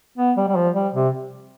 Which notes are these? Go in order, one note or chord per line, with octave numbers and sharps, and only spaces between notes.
B3
G3
G3
F3
G3
C3